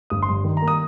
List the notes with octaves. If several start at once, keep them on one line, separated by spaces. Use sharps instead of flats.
G1 D#6
C6
G2
D#3
A#5
A#3
D#6